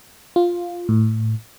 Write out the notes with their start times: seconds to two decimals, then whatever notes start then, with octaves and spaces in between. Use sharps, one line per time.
0.36 F4
0.89 A2